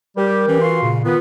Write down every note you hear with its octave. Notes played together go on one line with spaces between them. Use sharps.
G3 G4 A#4
E3 C#4
F4 F#4 F5 C6
A#2 C#3
D#3 B3 F4